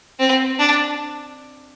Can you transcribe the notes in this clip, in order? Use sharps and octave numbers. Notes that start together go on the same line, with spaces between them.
C4
D4